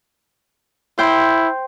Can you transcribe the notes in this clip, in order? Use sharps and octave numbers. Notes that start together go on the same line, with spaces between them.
E4 C5 G5